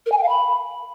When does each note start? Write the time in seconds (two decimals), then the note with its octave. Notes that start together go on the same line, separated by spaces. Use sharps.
0.06 A#4
0.11 G#5
0.17 G5
0.23 F5
0.28 B5